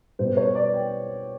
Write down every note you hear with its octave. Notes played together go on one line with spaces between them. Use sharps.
B2 G3 B3 C5
C#5
D5
G5